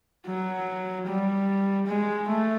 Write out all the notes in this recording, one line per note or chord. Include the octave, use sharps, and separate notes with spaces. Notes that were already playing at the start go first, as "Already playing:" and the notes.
F#3
G3
G#3
A3